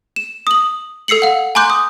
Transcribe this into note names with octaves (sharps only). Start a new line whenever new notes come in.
E7
D#6 F#7
A4 E6 C7 C#7 F#7
F5 F#5
G#5 A#5 C6 D6 F#6 G6
D#6